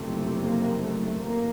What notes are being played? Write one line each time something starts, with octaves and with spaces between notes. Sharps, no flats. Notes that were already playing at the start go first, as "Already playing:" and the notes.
Already playing: F#1 F2 C3 A3
A#3
A3
A1 A#3